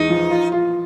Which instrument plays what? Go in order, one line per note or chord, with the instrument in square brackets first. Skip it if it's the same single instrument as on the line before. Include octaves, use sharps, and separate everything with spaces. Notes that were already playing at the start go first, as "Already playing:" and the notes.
Already playing: [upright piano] E2 G#3 [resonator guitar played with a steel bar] D#4
[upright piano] F3
F4
F4